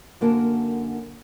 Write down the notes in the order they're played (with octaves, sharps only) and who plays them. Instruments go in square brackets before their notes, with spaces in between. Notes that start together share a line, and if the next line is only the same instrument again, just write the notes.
[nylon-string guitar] F#2 D3 A#3 F#4 A#4 A5